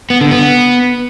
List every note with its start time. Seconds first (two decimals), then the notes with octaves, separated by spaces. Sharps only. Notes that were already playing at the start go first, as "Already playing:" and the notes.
0.10 B3
0.21 D3
0.31 B3